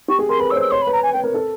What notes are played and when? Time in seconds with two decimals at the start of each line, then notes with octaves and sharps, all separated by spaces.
0.08 G4 C#6
0.19 G#4
0.29 A#4 C6
0.39 B4 B5
0.50 C#5 E6
0.56 C5
0.61 E6
0.71 C#5 C6
0.82 B5
0.87 B4
0.92 A#5
1.03 G#5
1.13 B4 G5
1.24 A#4
1.34 A4